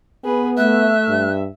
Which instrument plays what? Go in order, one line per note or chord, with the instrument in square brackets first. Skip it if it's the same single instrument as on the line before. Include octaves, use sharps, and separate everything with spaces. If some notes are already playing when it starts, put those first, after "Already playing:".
[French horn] B3 [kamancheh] G#4 B4
[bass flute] A3 [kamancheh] E5 [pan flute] F#6
[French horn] G2